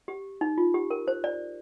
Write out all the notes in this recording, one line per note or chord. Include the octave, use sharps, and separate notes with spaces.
G4
D#4
F4
G4
A#4
C5
D5